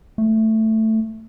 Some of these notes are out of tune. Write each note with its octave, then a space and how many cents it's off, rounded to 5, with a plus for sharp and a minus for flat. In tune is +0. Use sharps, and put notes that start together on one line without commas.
A3 +5